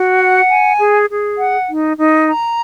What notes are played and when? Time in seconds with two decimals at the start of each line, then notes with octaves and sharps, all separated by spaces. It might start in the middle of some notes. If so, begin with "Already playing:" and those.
Already playing: F#4
0.20 F#5
0.50 G#5
0.79 G#4
1.09 G#4
1.38 F#5
1.68 D#4
1.98 D#4
2.27 A#5